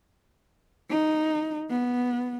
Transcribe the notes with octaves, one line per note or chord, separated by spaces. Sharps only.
D#4
B3